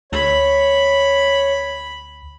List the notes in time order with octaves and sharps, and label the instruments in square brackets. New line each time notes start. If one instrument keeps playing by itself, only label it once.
[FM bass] D2 [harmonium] C#5 [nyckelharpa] B5